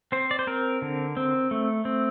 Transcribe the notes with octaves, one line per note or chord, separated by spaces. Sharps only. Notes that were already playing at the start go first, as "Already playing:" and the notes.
C4 C5
D5
C5
C4 A#4
D3
C4
A3
C4